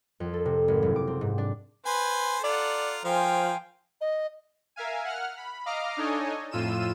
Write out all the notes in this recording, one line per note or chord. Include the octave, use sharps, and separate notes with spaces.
F2
A4
C3
G#1
F#1
D6
C4
G#2
D4
B4 C5 G#5 C6
F4 A4 D5 F#5 A#5
F3 A#4 C5 F5 G5 G#5
D#5
A#4 E5 F5 G#5
F#5 F6
B5
D#5 F5 A#5 D6 F6
D4 D#4 A4 C#5 D#5 G#5
F2 A2 F4 E6 D#7 E7